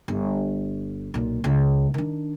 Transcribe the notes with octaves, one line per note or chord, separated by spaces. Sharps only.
G1
B1 A#2
C#2
D#3 D4